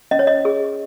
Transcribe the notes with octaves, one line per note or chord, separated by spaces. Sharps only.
C#4 D#5
C#5
D#5
G#4